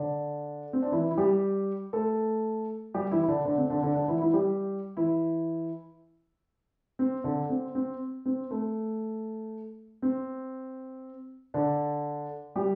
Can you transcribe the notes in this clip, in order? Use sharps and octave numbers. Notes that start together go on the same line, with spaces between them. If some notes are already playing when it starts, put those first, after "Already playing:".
Already playing: D3 D4
C4
D4
E3 E4
E4
G3 G4
A3 A4
G3 G4
E3 E4
E4
D3 D4
D3 D4
C4
D3 D4
D3 D4
D3 D4
E3 E4
E3 E4
G3 G4
E3 E4
C4
D3 D4
C4
C4
C4
A3
C4
D3 D4
G3 G4